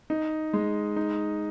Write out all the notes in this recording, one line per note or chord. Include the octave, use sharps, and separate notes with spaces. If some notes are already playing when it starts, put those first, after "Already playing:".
D#4
G#3
D#4